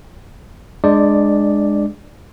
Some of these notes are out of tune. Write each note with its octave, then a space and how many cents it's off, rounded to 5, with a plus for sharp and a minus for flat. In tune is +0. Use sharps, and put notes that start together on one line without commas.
G#3 +0 D4 +20 D5 +0